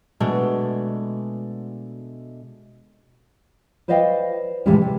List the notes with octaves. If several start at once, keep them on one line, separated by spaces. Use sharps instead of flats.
B2 G#3 A3 D4
B4 C5 D5 D#5 F5 G5
A2 C3 E3 F3 G3 G#3
C3